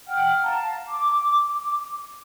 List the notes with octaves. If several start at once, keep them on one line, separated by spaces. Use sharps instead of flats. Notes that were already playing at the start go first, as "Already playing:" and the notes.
F#5 G5 F6
F5 A5 A#5
D6